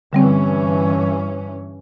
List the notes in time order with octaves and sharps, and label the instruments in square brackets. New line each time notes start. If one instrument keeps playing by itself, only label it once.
[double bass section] G2 E3 C#4 [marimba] D3 G3 C4